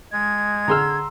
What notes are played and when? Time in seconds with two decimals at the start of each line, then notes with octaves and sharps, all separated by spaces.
0.12 G#3 G#6
0.68 D3 G#4 A#5 C6 E6 F6